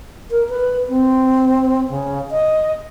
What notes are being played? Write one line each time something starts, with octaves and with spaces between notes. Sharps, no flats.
A#4
B4
C4
C#3
D#5